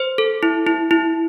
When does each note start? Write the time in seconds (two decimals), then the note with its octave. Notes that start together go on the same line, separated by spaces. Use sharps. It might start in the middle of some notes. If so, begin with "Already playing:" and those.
Already playing: C5
0.18 A4
0.43 E4
0.67 E4
0.91 E4